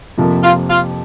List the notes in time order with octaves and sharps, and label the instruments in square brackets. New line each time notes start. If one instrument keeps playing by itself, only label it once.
[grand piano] F2 C3 F3 A#3
[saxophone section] F4
F4